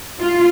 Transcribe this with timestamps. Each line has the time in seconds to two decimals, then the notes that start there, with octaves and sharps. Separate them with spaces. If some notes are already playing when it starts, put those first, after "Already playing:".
0.21 F4